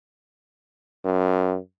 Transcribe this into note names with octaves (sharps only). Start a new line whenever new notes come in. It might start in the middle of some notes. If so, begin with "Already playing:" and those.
F#2